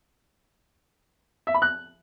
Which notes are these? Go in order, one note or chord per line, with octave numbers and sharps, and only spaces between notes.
E5
B5
F#6